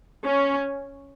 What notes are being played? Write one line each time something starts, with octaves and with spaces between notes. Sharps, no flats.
C#4